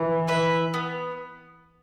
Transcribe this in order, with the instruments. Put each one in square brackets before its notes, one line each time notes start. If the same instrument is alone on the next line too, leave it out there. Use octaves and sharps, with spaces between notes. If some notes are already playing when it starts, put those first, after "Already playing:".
Already playing: [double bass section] E3
[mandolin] E4 B4 E5
B3